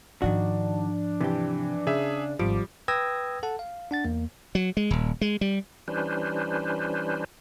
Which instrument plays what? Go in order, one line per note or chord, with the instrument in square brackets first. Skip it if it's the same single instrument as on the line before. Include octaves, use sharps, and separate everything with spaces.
[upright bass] G#2 F3 [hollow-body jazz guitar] D#3 F#4 [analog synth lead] D4
[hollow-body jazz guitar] C3 G4 [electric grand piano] E3
[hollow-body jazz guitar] C#3 [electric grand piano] G#4 E5
[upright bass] G#1 [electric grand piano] F3 [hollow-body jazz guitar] G3 [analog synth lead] D6
[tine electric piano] B4 G5 D#6 E6 G#6 A#6
A4 F#5 A5
F5
D4 F#5 A6
E2 A#3
[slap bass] F#3
G#3
D#1
G#3
G3
[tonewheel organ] E3 G3 C#4 D4 B4 C5